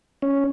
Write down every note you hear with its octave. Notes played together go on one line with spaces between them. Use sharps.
C#4